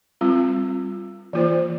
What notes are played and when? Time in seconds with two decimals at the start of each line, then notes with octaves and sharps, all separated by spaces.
0.21 G3 C4 F4
1.33 E3 A#3 F4 C5